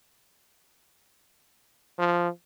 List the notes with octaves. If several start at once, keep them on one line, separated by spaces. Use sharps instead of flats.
F3